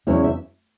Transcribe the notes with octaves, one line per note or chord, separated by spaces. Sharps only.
E2 C#3 G#3 C#4 E4 C#5
E5